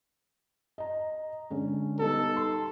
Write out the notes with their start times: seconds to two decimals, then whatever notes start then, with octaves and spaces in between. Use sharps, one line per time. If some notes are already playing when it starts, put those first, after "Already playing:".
0.78 D#5 A#5
1.51 D3 G#3 C#4
1.99 G3 B3 D#4 A4
2.37 C6